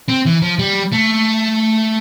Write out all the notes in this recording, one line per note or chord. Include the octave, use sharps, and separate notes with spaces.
C4
E3
F3
G3
A3